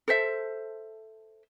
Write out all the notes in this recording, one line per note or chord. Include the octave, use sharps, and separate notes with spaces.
A4 C5 E5